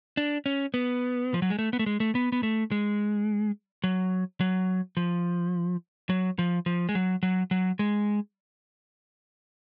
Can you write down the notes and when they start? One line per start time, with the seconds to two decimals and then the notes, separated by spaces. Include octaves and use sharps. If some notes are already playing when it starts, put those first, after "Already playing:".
0.17 D4
0.46 C#4
0.74 B3
1.34 F3
1.42 F#3
1.50 G#3
1.59 A3
1.73 B3
1.79 A3
1.86 G#3
2.00 A3
2.15 B3
2.32 B3
2.43 A3
2.71 G#3
3.84 F#3
4.40 F#3
4.97 F3
6.10 F#3
6.39 F3
6.66 F3
6.89 G#3
6.95 F#3
7.23 F#3
7.51 F#3
7.79 G#3